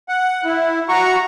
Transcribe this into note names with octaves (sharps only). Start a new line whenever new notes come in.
F#5
E4
F#4 A#5 C#6